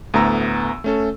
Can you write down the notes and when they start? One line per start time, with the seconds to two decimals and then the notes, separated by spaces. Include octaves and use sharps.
0.14 D2 A2 B3 A#5 E6
0.84 A3 C#4 A4